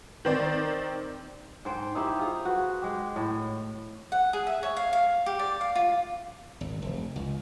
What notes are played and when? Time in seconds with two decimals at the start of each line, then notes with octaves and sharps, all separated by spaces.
0.25 D#3 C4 D5
1.65 G#2 C5 G5
1.95 D#4 E4 G4 C5
2.19 F4 G#4
2.45 F#4 B4
2.82 G#3 G4
3.16 A2
4.12 F#5
4.33 G#4
4.47 E5
4.63 C#5
4.77 F5
4.93 F5
5.26 G4
5.39 D5
5.61 F5
5.76 F4
6.61 G#1
6.82 F1
7.16 C#2